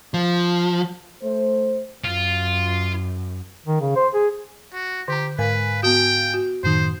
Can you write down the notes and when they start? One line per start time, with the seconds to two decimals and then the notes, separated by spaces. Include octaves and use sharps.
0.14 F3
1.22 A3 C5
2.04 F#2 F4
3.66 D#3
3.81 C#3
3.96 C5
4.14 G#4
4.73 F#4
5.08 D3 G4 A#5
5.38 G#2 A#4 B4 F5 G#5
5.83 B3 F#4 G5
6.34 F#4
6.63 F#2 A2 D#3 C5